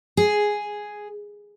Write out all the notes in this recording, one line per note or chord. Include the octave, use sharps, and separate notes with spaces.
G#4